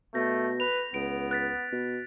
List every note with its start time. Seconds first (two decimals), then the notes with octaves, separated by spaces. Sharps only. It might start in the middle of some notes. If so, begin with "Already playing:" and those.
0.14 B2 A3 G6 A#6
0.60 B4 F7
0.94 C#2 B3 D7
1.31 F#6 A6 B6
1.72 B2